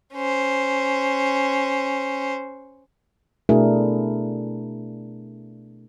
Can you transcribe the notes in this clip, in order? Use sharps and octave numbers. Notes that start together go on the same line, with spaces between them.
C#4 C5
B2 A3 D4 E4 G#4 A#4